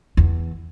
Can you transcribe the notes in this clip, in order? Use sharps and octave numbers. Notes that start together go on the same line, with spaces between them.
E2